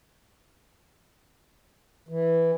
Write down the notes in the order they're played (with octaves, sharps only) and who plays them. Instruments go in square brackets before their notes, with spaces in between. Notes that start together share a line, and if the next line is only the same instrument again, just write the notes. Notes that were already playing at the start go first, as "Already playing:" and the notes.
[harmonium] E3